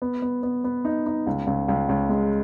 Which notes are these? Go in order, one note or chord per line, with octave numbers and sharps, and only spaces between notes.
B3
B3
B3
B3
D#4
D#4
C#2
C#2
C#2
C#2
G#3